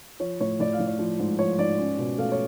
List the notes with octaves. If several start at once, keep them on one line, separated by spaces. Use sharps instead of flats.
F3 C#5
A2 C#5
A2 D5
F5
A2
D5
F3
G#2
F3 C#5
G#2 D5
C#4
B2
A3 F5
C#5